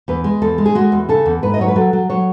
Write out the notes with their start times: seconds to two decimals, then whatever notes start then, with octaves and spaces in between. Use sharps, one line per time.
0.08 E2 B4
0.24 G#3
0.42 E2 A4
0.58 G#3
0.66 G#4
0.75 G#3 F#4
0.92 E2
1.09 C#3 A4
1.26 E2
1.43 G#2 B4
1.54 D#5
1.59 F#3 C#5
1.68 B4
1.76 F#3 A4
1.93 F#3
2.09 F#3 C#5